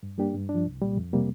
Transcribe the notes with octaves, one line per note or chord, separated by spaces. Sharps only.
G2
G3 A#3 D4 G4
G2
D4
F3
C2
A#2 G3
F2
C3 G3 A#3